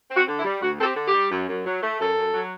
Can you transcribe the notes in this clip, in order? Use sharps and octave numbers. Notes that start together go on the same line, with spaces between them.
C4
F#4
D3
E4
G3
D2 F#4
C4 A4
G4
D3
G4
G3
F#2
F#2
F#3
A3
F#2 A4
F#2
F#3